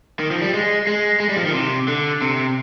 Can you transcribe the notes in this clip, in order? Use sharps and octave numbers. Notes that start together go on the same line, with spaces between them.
D#3
F3
G3
G#3
G#3
G#3
G3
F3
D#3
C3
D3
C3